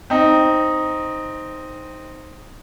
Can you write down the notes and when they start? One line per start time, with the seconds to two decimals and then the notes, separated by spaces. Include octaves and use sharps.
0.10 C4 D#4